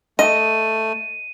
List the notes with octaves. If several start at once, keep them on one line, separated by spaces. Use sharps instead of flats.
A3 D#5 D#7